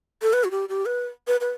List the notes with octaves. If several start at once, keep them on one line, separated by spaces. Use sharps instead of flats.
A4
B4
F#4
G4
G4
B4
B4
B4